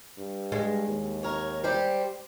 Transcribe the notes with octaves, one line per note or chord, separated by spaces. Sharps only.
G2
G#3
D#2
A#4 C#5
G3 G4 C5